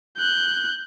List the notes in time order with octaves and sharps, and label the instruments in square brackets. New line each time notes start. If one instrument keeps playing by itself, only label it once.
[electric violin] F#6 G6